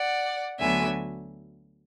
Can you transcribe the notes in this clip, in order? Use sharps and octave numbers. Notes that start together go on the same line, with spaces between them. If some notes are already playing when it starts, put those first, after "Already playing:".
Already playing: D5 F#5
D2 D3 F#3 B3 E5 G#5